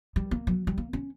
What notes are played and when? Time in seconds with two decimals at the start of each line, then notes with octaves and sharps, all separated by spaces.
0.16 G3
0.31 A#3
0.47 F#3
0.67 G3
0.78 A#3
0.93 C#4